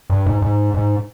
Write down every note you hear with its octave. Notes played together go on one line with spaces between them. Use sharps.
G2
G#2
G#2
G#2